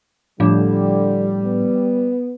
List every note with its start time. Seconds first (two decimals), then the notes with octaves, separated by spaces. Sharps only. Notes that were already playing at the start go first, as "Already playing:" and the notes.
0.40 A2 D3 F3 G3 D4
1.43 B3